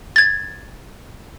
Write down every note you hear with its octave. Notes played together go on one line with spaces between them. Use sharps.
G#6 A6